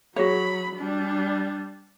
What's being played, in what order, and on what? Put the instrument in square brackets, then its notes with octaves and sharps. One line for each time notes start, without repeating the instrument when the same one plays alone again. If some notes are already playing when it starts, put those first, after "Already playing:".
[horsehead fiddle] F#3 B5 [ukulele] F#4 G#4 C#5
[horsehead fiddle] G3 D4